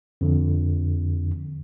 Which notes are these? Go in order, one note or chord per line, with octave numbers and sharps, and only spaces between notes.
F2 D3